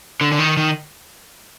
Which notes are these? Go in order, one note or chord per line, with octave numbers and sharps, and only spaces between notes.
D3
D3
D#3
D#3